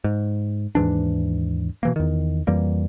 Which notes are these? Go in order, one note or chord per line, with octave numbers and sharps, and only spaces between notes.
G#2
D#2 G#2 E3 D4
B2 E3 A#3
E2 D#3
F2 E3 G3 A#3